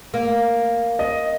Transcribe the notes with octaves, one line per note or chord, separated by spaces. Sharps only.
A#3
D#5